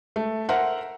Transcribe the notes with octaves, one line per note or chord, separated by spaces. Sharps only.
A3
A#4 C5 E5 F#5